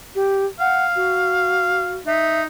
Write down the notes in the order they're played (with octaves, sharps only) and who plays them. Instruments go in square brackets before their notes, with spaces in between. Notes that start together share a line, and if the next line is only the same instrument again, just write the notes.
[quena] G4
[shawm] F5 [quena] F#5
[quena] F#4
[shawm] D#4 [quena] E5